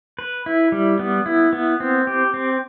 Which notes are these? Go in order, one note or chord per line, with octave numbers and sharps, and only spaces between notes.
B4
E4
G3
B3
E4
B3
C4
G4
C4